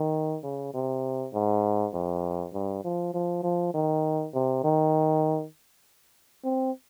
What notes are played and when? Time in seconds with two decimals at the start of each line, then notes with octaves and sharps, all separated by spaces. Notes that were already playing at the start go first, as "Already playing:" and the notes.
Already playing: D#3
0.43 C#3
0.74 C3
1.34 G#2
1.93 F2
2.53 G2
2.84 F3
3.14 F3
3.43 F3
3.74 D#3
4.34 C3
4.64 D#3
6.44 C4